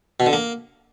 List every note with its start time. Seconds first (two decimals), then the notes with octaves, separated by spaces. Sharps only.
0.20 B2
0.26 D3
0.33 A#3